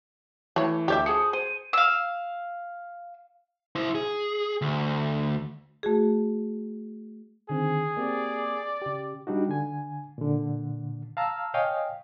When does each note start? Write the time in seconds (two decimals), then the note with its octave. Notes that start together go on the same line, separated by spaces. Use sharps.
0.56 E3 A3 C#5
0.88 D2 G4 C#5 E5 D6 G6
1.06 F3 G#4 D#6 C#7
1.33 C5 D#7
1.73 F5 E6
3.76 E4 C5
3.95 G#4
4.61 D2
5.83 A3 F#4 G#4
7.50 D3 D#3 C4 G#4
7.97 A#3 C4 G4 D5
8.82 C#3 G4
9.27 G3 D4 D#4 F#4
9.49 D3 G#5
10.18 A#2 D3
11.17 F5 A5 A#5 E6 F6
11.54 C#5 D#5 F5 G5 G#5 D#6